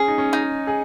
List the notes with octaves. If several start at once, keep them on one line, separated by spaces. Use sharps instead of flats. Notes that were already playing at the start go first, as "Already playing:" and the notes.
Already playing: C#4 G#4
D#4
C#4
D#4
G#4